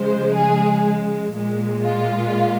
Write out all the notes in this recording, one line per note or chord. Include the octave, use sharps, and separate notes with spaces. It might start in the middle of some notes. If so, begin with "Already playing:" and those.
Already playing: C#3 F3 G#3 C5
G#4
A#2 G#3
F4